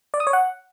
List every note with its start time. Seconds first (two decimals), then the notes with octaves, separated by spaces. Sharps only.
0.14 D5
0.20 D#6
0.27 C#5
0.33 F#5